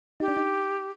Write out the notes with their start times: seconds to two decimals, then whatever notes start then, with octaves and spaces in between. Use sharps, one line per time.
0.20 D#4 G4
0.28 D4
0.37 D#4